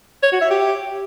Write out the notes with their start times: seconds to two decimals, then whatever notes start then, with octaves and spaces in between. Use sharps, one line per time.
0.23 C#5
0.32 F#4
0.41 E5
0.50 G4